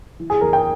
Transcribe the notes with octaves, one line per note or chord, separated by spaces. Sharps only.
E3
G#4
E2 A#4
G5